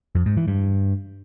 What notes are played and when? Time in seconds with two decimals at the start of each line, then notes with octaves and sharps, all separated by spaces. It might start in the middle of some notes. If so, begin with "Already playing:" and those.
0.15 F2
0.26 G#2
0.37 E3
0.48 G2